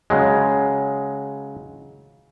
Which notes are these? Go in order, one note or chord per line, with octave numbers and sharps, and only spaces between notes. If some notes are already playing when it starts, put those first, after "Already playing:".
C#3 F#3 G#3